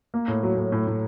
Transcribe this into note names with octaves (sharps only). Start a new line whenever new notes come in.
A#3
A2
F#3
A2
A2
A2